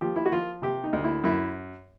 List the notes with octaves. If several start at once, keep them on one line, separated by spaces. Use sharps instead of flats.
F3 G4
E4
F#4
F3 F4
C3 G4
D#4
D2
E4
F#2 E4